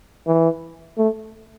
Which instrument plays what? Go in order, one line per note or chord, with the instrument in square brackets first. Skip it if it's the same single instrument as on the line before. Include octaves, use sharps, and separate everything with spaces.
[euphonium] E3
A3